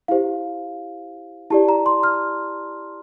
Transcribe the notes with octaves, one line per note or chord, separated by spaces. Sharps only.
E4 G4 C5 F5
E4 G4 D5 A5
A#5
C6
F6